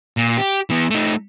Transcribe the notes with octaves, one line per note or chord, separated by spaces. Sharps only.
A#2
G4
E3 B3
A3 D#4